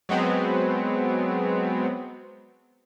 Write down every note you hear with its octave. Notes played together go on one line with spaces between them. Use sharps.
F#3 G#3 B3 C4